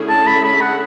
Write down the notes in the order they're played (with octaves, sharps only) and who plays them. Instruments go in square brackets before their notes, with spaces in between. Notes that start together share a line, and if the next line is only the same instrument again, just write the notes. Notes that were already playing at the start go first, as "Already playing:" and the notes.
Already playing: [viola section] D3 A3 C#4 E4 G#4
[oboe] A5
B5
B5
F#5